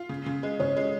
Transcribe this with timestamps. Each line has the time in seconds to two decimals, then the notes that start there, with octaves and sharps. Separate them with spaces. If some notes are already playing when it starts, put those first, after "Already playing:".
Already playing: F4
0.09 C#3
0.26 C#3
0.43 G#3
0.60 C#3 C#5
0.77 G#3